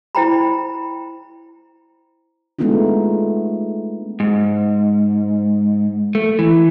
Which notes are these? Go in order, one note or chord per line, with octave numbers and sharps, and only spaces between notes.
E4 C5 G5 A#5 B5
G#3 A3 B3 D4 D#4 F4
G#2
A3
E3